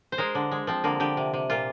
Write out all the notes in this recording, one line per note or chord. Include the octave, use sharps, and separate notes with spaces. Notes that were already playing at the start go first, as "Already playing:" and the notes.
C5
G#3 A#4
D3
G#3
F3 C4
D3 A#3
D3 G4
C3
C3
A#2 F4